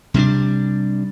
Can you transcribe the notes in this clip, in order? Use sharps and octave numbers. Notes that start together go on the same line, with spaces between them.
C3 G3 B3 D4